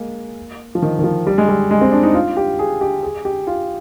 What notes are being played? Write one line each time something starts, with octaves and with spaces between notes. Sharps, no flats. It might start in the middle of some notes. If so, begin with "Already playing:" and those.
Already playing: G#3 A#3
F3
D#3
D#3
F3
G3
G#3
G3
G#3
C4
D4
D#4
F4
G4
G#4
G4
G#4
G4
F4